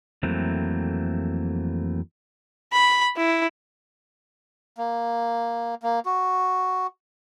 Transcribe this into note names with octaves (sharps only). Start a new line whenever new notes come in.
F2 E3 F#3 A3 A#3 C4
B5
E4
A#3
A#3
F#4